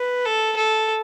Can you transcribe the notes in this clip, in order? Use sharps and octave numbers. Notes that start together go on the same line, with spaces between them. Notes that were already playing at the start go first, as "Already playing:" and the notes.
Already playing: B4
A4
A4